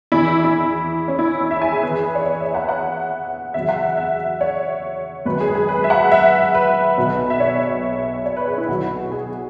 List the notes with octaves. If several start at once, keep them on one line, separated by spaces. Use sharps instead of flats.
E2 E3 E4
E4
C#4
E4
E4
E5
G#5
G#4
E2 E3 B4
G#4
B4
C#5
C#5
E5
F#5
F#5
E2 C#3 F#3 E5
F#5
E5
E5
C#5
G#1 F#2 F#3 B4
G#4
G#4
B4
E5
F#5
E5
B4
B1 B2 F#3
E5
C#5
C#5
B4
G#4
E4
B1 B2 F#3 F#4
G#4